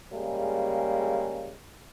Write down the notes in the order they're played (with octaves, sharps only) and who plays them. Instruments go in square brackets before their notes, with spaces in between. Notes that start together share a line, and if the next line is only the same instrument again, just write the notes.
[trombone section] C#3 G3 G#3 A#3